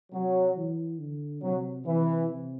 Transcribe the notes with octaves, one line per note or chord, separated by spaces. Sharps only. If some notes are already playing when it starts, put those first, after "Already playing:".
C3 F#3
E3
D3
C3 F#3
C3 E3
C3